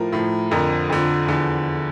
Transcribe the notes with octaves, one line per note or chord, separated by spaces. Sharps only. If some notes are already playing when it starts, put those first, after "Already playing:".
Already playing: A2 F3 A#4
A2 F3
F2 D3 F3 A#4
F2 D3 F3
E2 D3 F3